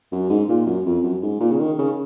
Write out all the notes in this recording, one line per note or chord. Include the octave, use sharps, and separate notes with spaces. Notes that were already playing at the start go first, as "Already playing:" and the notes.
F#2
G#2
A#2
F#2
F2
F#2
G#2
A#2
C#3
D#3
C#3